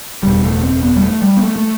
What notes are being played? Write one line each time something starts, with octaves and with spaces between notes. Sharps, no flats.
F#1 E2 B2 G3
A3
C4
B3
G3
A3
G3
B3
A3
A3